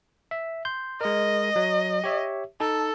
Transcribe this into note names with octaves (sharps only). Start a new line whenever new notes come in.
E5
C6 G6
G#3 A#4 D#5
F#3
G4 C#5 E5
D#4 A4